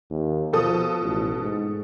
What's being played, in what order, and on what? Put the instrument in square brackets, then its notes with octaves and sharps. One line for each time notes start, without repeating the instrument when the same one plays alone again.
[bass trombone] D#2
[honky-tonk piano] B2 A4 D#6 [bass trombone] F3
[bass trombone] A1
G#2